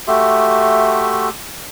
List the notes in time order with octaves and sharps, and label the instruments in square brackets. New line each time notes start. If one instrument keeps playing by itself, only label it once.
[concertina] A3 F#4 G4 E5 C6